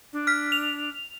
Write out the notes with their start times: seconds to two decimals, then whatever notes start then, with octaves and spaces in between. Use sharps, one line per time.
0.13 D4
0.27 F6 B6
0.52 F7